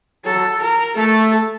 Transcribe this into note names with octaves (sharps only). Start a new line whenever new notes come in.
F#3 A4
A#4
A3 A4